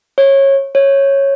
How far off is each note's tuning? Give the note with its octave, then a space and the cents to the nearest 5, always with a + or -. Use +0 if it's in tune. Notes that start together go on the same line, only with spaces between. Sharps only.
C#5 -20
C#5 -10